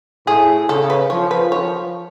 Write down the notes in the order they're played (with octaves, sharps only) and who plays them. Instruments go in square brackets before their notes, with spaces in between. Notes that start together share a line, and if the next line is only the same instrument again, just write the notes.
[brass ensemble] A2 [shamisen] G#4
[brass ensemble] C#3 [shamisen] A4
[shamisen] B4
[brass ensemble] F3 [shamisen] C#5
[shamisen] B4
[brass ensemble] F3 [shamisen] C#5